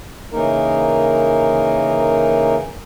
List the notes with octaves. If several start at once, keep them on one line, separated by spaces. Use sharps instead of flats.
C#3 E3 A#3 D#4 A#4